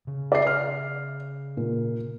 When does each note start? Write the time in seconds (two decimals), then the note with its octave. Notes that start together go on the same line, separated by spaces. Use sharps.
0.07 C#3
0.32 D5 E5 C7
0.47 F6
1.57 A#2